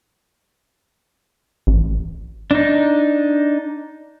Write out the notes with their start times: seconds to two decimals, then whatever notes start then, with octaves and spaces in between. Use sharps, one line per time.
1.67 A1
2.51 D4 D#4